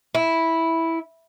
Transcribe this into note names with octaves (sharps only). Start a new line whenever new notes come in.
E4